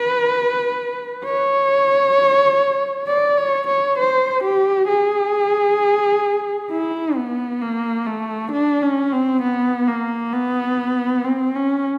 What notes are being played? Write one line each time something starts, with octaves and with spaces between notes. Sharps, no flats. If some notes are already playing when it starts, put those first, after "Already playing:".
Already playing: B4
C#5
D5
C#5
C#5
C5
G4
G#4
E4
B3
A#3
A3
D4
C#4
C4
B3
A#3
B3
C4
C#4